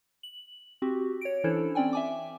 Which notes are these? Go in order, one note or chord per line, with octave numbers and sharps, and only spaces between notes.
F#7
C4 F#4 G4
C#5 D7
E3 C#4 D4 E4 A4 C5
C4 C#4 D5 G5 G#5
E5 G#5 D6